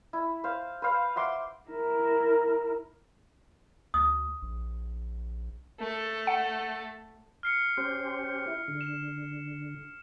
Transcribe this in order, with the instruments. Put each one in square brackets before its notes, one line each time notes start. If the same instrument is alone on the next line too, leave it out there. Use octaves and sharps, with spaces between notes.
[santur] E4
C5 F5
B4 C5 F5
E5 F#5 C6 D6
[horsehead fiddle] E4 A#4
[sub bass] D2 [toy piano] D#6
[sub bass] A#1
[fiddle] A3 A4
[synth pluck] F#5
[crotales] F6 C7 C#7
[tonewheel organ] C#4 G4 C5
E4
D3
[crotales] E7